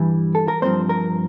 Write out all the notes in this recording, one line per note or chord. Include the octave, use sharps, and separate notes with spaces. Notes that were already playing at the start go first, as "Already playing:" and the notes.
Already playing: G2 E3 G3
A4
A#4
G2 F3 A3 C4 C5
A#4